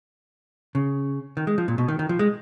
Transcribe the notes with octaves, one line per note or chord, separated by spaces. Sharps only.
C#3
D#3
G#3
F3
A#2
B2
D#3
D#3
F3
G#3